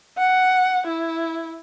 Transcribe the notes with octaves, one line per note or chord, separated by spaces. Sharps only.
F#5
E4